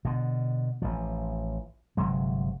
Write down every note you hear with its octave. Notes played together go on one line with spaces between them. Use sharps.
B2 D3
A1 F3
G1 C3 F#3 G#3